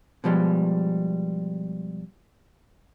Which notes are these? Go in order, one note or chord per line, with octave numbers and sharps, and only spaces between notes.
B2 F3 G3 G#3